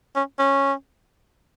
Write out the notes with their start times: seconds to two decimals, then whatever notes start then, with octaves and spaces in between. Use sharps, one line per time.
0.16 C#4
0.39 C#4